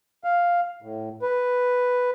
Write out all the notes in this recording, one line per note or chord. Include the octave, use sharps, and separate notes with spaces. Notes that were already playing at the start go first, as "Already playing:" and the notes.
F5
A2
B4